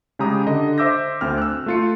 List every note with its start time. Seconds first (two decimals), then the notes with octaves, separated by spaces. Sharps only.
0.19 C#3 G#3 G4 A#5 D#6
0.47 D3 D#5
0.78 C5 E5 D6 E6 G6 A#6
1.21 D2 C4 G5 F6
1.38 E6 F#6
1.66 A3 F4 C#7